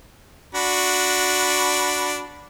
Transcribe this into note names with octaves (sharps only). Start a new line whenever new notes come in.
D4 F#4 B5